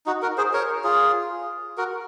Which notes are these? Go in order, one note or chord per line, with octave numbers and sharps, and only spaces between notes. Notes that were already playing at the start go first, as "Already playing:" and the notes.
D#4 F#4
F#4 A#4
G#4 C5
A#4 C#5
F4 G#4
F#4 A#4